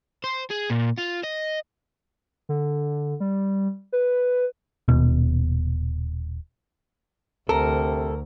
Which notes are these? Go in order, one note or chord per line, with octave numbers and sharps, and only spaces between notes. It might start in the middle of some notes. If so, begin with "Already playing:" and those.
C5
G#4
A#2
F4
D#5
D3
G3
B4
D#1 B2
D2 C3 A4 A#4